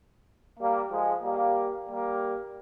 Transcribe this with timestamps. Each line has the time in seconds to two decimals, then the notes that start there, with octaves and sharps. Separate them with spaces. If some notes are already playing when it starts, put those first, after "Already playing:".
0.59 G3 A#3
0.91 F3 G#3
1.23 G3 A#3
1.89 G3 A#3